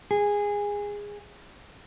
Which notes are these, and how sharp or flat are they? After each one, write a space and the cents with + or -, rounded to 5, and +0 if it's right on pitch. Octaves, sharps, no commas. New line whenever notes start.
G#4 -15